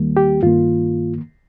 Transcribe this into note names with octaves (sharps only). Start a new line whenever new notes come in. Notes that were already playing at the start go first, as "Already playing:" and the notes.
Already playing: D#2 D#3 G3 A#3
G4
G2 D#3 A#3 F4